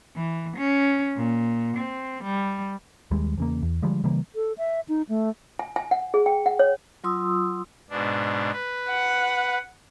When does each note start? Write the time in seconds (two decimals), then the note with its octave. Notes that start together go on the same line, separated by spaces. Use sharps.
0.16 E3
0.57 C#4
1.17 A#2
1.76 C4
2.24 G3
3.11 D#2 G3 G#3
3.38 E2 C#3 A#3
3.62 E2
3.82 D3 F3 G3 G#3
4.04 C#3 E3 G3 A#3
4.35 A4
4.58 E5
4.89 D#4
5.09 A3
5.59 G#5
5.76 G#5
5.91 F#5
6.14 G#4
6.26 G5
6.46 F#5
6.59 C#5
7.04 F#3 F4 C6 D#6 E6
7.90 G#2 B2 D4
8.53 B4
8.90 F#5